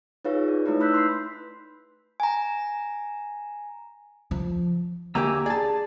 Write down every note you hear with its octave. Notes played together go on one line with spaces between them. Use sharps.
D#4 F4 G#4 B4 C#5 F5
D5
A3 D#4 E4 B4
B5 E6 F#6 G6 B6
C6 E6 B6 C7
G#5 A#5
F3
D2 A#3 G4 G#5 A#5 E6
G#4 D5 A5